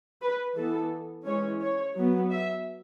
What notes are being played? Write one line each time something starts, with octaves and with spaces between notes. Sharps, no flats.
B4
E3 B3 A4
E3 G#3 C#4 C#5
C#5
F#3 B3
E5